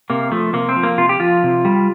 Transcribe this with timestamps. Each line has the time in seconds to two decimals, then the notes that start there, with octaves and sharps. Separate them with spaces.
0.10 C3 A#3
0.32 F3 A3
0.53 C3 A#3
0.69 C4
0.76 F3
0.83 A#3
0.98 C3 F4
1.09 G4
1.20 F3 F4
1.44 C3
1.65 G3